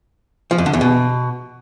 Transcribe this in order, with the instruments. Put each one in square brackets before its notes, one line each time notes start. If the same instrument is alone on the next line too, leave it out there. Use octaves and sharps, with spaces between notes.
[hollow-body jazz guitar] F3
F2
D3
E2
B2